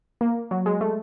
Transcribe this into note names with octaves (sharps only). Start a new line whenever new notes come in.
A#3
F#3
G#3
A3